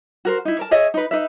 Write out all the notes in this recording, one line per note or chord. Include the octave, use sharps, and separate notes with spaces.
F#4 A#4 C5
D#4 E4
A#4 A5
G#4 C#5 D#5 E5
D#4 B4
D#4 B4 E5